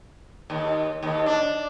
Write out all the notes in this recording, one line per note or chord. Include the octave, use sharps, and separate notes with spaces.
D#2
D#2
D4